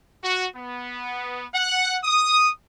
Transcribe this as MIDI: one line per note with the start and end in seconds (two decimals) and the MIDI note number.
0.22 0.45 66
0.55 1.45 59
1.53 1.97 78
2.03 2.48 87